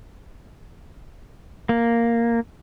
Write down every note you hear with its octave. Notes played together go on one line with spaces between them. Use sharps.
A#3